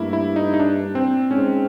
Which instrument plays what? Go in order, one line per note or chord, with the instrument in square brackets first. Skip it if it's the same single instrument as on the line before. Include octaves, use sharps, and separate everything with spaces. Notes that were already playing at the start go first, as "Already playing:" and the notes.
Already playing: [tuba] G2 [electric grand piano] A3 A#3 E4
[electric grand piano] E4
D#4
D#4
D4
C4
[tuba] G#2 [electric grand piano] C#4